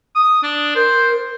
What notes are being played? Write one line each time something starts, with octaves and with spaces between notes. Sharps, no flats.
D#6
D4
A#4 C5